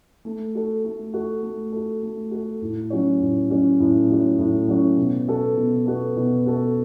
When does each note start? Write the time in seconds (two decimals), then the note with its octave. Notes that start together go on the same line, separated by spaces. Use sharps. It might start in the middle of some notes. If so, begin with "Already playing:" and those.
0.25 A3
0.55 F#4 A4
0.85 A3
1.14 F#4 A4
1.43 A3
1.72 F#4 A4
2.03 A3
2.31 F#4 A4
2.62 A2
2.90 F#3 C#4 F#4 C#5
3.21 A2
3.51 F#3 C#4 F#4 C#5
3.80 A2
4.10 F#3 C#4 F#4 C#5
4.39 A2
4.69 F#3 C#4 F#4 C#5
4.97 B2
5.28 B3 F#4 A4
5.56 B2
5.86 B3 F#4 A4
6.16 B2
6.46 B3 F#4 A4